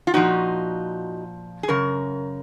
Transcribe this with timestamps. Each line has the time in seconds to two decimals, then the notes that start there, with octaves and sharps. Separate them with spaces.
0.07 F4
0.14 A#2 F3 D#4 F#4
1.63 G#4
1.68 F#2 C#3 A#4